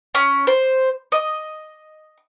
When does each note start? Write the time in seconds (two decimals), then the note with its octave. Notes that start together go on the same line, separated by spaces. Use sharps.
0.15 C#4
0.47 C5
1.12 D#5